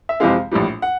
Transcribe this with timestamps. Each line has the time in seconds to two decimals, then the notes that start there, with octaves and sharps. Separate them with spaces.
0.09 E5
0.20 F2 C3 E3 G#3 F5
0.52 A#1 A2 E3 G3
0.82 F#5